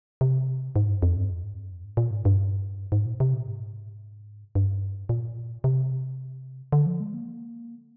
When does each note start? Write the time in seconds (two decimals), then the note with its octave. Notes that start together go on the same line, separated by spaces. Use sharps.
0.21 C3
0.76 G#2
0.89 G2
1.02 F2
1.16 G2
1.30 F2
1.44 G#2
1.56 G2
1.71 F2
1.85 G#2
1.97 A#2
2.11 G#2
2.25 G2
2.92 G#2
3.06 A#2
3.20 C3
3.34 A#2
3.46 G#2
4.55 G2
5.09 A#2
5.64 C3
6.72 D3
6.86 F3
7.00 G#3
7.14 A#3